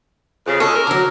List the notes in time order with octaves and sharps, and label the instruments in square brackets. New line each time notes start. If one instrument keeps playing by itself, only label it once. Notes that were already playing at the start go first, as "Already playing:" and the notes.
[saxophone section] F2 C#3
[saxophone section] G#3 C#4 [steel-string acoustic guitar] A4
[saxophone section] A#4
[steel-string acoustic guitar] D3 F#3